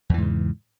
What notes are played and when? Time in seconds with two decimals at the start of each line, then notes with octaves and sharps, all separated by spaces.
0.10 E2
0.14 E3
0.18 G#2
0.22 C#3